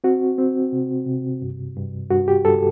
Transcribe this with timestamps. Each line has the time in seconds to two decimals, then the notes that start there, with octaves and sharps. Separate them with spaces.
0.04 C4 F#4
0.38 C4
0.72 C3
1.06 C3
1.42 G2
1.76 G2
2.10 G2 F#4
2.28 G4
2.45 G2 A4